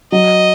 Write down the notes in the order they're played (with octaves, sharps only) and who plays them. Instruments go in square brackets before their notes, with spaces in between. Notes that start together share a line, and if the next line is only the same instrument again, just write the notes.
[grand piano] F#3 [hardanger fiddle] D#5